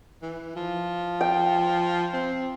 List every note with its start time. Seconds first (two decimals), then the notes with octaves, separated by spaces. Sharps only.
0.22 E3
0.56 F3
1.21 G5
2.14 C4